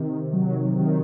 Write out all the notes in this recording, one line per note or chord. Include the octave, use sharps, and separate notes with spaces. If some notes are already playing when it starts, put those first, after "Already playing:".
Already playing: C3 D#3
F#3
D#3